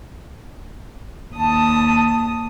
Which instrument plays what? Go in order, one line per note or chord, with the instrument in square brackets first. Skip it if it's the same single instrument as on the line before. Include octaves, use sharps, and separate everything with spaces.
[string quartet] D#2 D#6 [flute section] A5